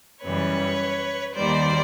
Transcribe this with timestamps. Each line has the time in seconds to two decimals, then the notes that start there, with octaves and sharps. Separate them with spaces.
0.23 F#2 C#3 E3 G3 B4 C#5
1.35 D#2 D#3 G3 C5 D5